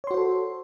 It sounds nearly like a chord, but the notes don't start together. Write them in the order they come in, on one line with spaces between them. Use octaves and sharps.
C#5 C6 F#4 C5 A4